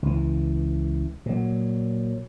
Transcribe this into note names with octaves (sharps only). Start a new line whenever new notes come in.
C#2 E3
A#2 F#3